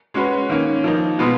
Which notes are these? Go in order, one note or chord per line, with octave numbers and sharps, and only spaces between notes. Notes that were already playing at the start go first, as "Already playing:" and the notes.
G#3 C#4 F#4 B4
D#3 A#3 C#4
F3 A#3 D#4
B2 G#3 B3 F4 B4